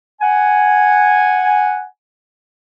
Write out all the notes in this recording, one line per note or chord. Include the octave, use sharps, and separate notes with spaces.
F#5 G#5